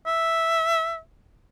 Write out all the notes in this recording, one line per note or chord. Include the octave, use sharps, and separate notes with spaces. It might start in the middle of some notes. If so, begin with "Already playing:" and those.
E5